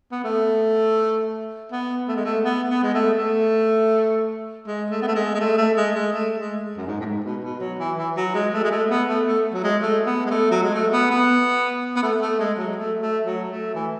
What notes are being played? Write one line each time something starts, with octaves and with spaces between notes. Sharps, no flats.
B3
A3
B3
A3
G#3
A3
B3
B3
G#3
A3
A3
G#3
A3
B3
A3
G#3
G#3
A3
A3
G#3
G#3
A3
G#3
F#2
G#2
A2
G#2
B2
B2
F#3
E3
E3
F#3
G#3
A3
G#3
A3
B3
A3
A3
F#3
G#3
A3
B3
G#3
A3
F#3
G#3
A3
B3
B3
B3
A3
A3
G#3
F#3
A3
A3
F#3
A3
E3